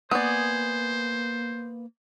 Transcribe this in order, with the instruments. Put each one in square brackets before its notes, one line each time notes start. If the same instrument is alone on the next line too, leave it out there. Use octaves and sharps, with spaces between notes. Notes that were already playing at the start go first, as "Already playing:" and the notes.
[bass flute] A#3 [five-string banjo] B3 D5 [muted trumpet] C5 [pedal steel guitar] G#5 D#6